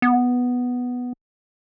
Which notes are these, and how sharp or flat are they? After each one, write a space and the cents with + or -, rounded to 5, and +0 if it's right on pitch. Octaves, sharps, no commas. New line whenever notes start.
B3 +0